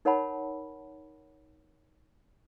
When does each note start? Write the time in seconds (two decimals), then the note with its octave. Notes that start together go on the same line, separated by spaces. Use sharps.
0.05 D#4 A#4 C#5 F#5 A5 B5